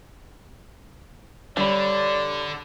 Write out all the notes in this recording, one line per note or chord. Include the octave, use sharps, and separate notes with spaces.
D3 G3 C#5 D5 B5